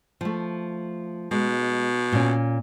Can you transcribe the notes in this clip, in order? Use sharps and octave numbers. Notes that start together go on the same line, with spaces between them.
F3 A3
B2 G#3
A#2 C#4